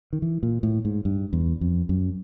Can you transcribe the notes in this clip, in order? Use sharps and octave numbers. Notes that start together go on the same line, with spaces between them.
D#3
E3
A#2
A2
G#2
G2
E2
F2
F#2